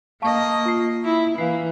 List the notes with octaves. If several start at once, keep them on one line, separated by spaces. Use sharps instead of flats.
A#3 D#5 F5 A5 C#6
F4 C7
E4
E3 A#3 F5 C7